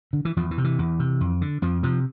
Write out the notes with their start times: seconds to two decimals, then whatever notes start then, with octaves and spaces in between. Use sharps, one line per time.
0.13 D3
0.25 E3
0.37 E2 F3
0.51 E3
0.58 C3
0.64 E3
0.79 E2
0.99 C3
1.21 F2
1.41 D3
1.62 F2 F3
1.83 C3 F3